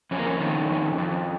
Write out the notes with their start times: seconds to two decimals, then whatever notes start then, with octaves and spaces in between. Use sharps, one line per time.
0.11 F2 C#4
0.19 A#3
0.26 C#4
0.40 D#3
0.69 F2
0.98 F2